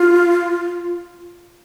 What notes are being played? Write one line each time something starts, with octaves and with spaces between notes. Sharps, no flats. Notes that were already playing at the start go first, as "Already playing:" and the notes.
Already playing: F4